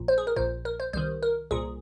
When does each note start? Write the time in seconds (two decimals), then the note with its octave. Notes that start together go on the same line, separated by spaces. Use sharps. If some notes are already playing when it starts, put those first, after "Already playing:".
Already playing: A#1 A#2
0.08 C5
0.18 G#4
0.27 A#4
0.36 A#1 A#2 C5
0.65 A#4
0.80 C5
0.93 C2 C3 D#3 C5
1.23 A#4
1.51 C2 A#2 G#4